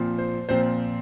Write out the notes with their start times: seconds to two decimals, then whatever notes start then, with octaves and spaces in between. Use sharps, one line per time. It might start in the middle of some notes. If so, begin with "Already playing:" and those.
Already playing: A#2 F3 C4
0.19 C5
0.49 A#2 F3 C4 C5